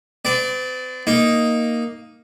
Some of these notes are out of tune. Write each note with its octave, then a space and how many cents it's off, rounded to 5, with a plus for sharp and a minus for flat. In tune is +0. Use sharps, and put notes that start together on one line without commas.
C4 -45 D5 -5
A#3 +0 D#4 +0